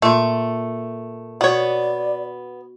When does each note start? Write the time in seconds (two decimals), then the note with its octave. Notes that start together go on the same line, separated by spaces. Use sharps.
0.02 A#2 A3
1.41 B2 B3 C#5 D5